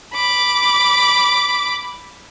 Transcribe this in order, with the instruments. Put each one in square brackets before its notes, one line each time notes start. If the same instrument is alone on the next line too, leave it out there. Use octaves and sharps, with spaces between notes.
[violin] B5 D6